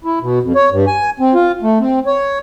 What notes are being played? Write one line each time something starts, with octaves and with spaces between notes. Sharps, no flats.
E4
B2
F2
C#5
G2
G#5
C4
F4
A3
C4
C#5